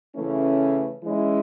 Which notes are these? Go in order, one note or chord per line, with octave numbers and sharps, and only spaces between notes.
C#3 E3 A3 C#4 E4
E3 G#3 C#4 E4